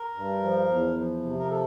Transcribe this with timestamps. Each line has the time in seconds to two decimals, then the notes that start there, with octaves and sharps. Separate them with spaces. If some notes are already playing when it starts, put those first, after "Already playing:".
Already playing: A#4
0.15 G2
0.42 F3
0.69 E2
0.95 F3
1.23 C3
1.39 A#4
1.50 A4